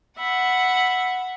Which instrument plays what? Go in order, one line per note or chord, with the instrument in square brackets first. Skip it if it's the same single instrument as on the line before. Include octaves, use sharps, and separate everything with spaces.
[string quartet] E5 F#5 B5